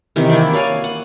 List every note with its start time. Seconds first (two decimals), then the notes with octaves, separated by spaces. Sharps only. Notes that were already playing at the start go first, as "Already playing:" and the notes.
0.16 C3 D#3 E3
0.30 A#3 E4 D5
0.53 C#5 D5 F5 G#5
0.84 F#5